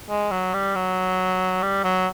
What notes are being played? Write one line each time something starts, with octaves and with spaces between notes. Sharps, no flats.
G#3
F#3
G3
F#3
G3
F#3